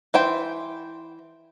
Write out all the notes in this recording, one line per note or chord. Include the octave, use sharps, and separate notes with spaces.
E3 C5 G5